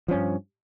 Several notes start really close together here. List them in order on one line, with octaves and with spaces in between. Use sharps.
F3 C#4 G2